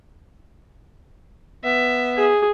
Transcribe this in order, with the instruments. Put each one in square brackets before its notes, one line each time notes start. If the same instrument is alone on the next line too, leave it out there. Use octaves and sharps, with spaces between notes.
[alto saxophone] B3 [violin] E5
[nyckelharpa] G#4